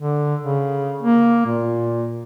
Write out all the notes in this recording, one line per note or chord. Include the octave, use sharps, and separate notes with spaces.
D3
C#3
A#3
A#2